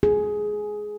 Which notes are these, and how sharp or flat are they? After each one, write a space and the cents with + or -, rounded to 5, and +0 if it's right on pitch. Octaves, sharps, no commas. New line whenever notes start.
G#4 +10